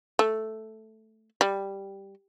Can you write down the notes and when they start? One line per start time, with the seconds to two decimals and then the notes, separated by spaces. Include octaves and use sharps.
0.19 A3
1.41 G3